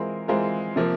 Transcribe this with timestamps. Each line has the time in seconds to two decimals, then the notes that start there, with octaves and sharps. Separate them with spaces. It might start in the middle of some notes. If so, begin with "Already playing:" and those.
Already playing: E3 G#3 C4 F4 A#4
0.28 E3 G#3 C4 F4 A#4
0.76 C3 F3 A#3